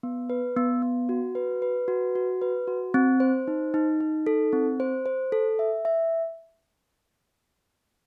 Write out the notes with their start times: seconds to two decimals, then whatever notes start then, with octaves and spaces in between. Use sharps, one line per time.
0.03 B3
0.30 B4
0.57 B3
0.82 B3
1.09 F#4
1.35 B4
1.62 B4
1.88 F#4
2.15 F#4
2.41 B4
2.67 F#4
2.94 C4
3.20 C5
3.48 D#4
3.74 D#4
4.00 D#4
4.26 A4
4.53 C4
4.80 C5
5.06 C5
5.32 A4
5.59 E5
5.85 E5